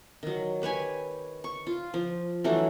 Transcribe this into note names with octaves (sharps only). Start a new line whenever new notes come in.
D#3 F#3
G4 B4 C#5 G#5
C#6
F4
F3
E3 F#3 A3 D4